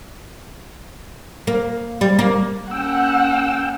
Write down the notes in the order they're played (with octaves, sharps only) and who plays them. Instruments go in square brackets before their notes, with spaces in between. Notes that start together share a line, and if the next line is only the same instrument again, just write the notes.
[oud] A#3
G3
A#3
[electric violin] A#3 C#4 [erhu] F#5 [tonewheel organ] G5 E6